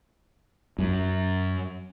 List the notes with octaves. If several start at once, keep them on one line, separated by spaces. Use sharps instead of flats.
F#2